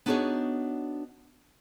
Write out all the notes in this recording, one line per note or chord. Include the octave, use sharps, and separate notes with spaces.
B3 D4 D#4 F#4 G#4 C#5